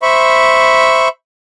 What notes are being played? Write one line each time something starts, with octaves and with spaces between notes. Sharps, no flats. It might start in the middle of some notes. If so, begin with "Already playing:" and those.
C5 E5 B5 C#6